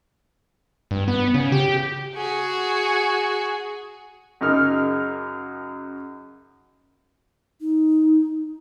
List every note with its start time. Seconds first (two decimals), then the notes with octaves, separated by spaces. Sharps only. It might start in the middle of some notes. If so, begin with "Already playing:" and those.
0.91 G2
1.08 B3
1.34 C#3
1.52 G4
2.16 F#4 G#4
4.41 F#2 C#3 D#4 A#4 F6
7.60 D#4